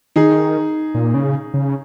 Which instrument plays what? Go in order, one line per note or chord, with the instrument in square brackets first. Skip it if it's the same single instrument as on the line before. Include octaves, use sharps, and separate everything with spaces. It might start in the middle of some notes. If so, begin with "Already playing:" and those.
[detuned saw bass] D#3 [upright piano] D#4 G#4
[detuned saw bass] A#2
C#3
C#3